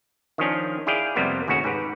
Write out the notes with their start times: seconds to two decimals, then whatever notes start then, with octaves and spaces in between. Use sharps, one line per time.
0.38 D#3 F3 C#4 D4
0.87 E4 G#4 D5 F5 G5
1.16 F2 C3 G3 A#3 B3
1.48 A1 D#2 C#3 C#4 F#4
1.64 G#2 G4 B4